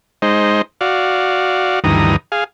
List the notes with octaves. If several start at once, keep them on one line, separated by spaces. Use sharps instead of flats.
G#3 D#4 C5
F#4 D5 F5
D2 G2 D#3 E3 A#5 D#6
G#4 F5